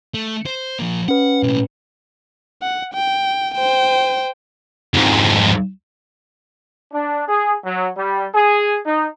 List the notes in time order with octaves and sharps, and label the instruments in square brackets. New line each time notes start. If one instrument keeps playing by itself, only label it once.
[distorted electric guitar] A3
C5
F3 A#3
[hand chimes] C#4 B4 [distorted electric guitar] F#5
[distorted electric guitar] B1 A2
[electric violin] F#5
G5
C5 G5
[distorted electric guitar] F2 G#2
[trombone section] D4
G#4
F#3
G3
G#4
D#4